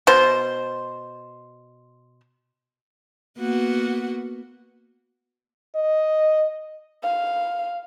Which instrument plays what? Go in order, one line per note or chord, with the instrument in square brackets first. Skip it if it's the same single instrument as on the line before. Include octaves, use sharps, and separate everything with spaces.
[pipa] B2 C5
[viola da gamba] A#3 B3 F#4
[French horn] D#5
[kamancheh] F5